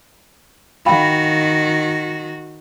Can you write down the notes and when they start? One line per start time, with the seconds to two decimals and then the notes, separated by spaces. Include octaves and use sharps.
0.86 D#3 F#4 F5 G5 B5